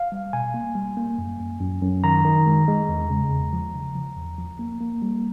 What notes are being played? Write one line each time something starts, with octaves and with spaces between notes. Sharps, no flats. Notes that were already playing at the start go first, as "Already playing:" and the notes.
Already playing: F5
G3
B2 G#5
A#3
G3
A#3
F#2
F#2
F#2
F#2
D#3 A#5
D#3
G#3
G#3
E2
C#3
E2
F3
C#3
F3
E2
F3
A#3
A#3
G3